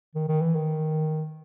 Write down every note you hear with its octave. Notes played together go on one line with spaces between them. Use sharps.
D#3
D#3
E3
D#3